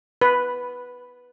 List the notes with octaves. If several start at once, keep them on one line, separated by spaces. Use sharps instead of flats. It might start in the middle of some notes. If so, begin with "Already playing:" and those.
B4